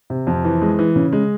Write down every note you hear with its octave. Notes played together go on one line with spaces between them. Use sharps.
C3
F2
E3
G#3
E3
C#3
G#3